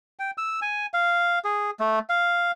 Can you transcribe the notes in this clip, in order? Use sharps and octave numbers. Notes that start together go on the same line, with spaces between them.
G5
E6
G#5
F5
G#4
A3
F5